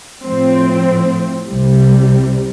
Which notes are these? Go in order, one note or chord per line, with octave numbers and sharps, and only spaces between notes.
A2 F3 C4
C2 C3 G3